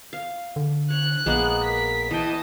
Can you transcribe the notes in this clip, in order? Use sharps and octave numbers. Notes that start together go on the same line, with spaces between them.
F5
D3
C#5 F#6
A#1 G#3 A#3 B3
A#4 B6
E3 D#5 G5 A5